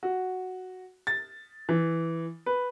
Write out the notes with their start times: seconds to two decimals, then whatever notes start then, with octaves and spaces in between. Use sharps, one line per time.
0.03 F#4
1.07 A6
1.69 E3
2.46 B4